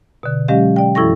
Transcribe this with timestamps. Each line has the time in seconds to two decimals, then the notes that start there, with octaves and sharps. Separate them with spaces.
0.23 B2 D3
0.48 F#3 G#3 C#4 G4 D#5 F5
0.76 D5 G5
0.95 F#2 E3 E4 A4 C#6 A#6